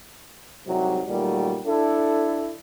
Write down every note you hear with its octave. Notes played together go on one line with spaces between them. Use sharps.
C2 G#2 C3 F#3
A#2 D#3 F#3 G3 A3
D4 E4 A4